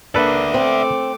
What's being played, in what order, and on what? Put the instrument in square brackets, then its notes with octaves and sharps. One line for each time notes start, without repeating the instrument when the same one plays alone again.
[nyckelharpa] A#3 D4 [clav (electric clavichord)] A4 B4 [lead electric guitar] D5 E5
[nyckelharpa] A3 D6 [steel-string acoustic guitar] C4